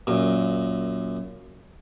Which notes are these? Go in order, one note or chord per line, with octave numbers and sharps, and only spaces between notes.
F#2 A#2